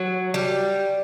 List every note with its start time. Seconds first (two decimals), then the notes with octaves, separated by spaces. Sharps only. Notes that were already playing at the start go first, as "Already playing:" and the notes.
Already playing: F#3
0.34 G3